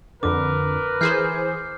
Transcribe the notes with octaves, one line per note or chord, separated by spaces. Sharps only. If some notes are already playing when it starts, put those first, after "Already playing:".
F2 D3 A#4 B4 D6
E3 G#4 C5 F6 G6 C7